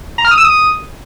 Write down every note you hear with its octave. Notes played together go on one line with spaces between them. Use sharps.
A#5
F6
D#6
E6
D#6